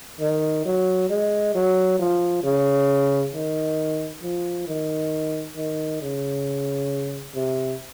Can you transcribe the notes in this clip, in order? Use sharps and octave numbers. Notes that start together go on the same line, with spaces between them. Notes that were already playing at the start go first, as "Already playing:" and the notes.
D#3
F#3
G#3
F#3
F3
C#3
D#3
F3
D#3
D#3
C#3
C3